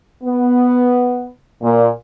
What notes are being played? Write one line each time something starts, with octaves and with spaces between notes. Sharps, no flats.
B3
A#2